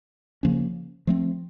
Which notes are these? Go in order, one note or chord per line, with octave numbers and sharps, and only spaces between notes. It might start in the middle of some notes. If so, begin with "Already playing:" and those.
C#3 F3 A#3 C#4
F3 A3 C4